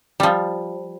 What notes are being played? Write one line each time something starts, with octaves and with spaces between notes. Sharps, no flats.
F3 G3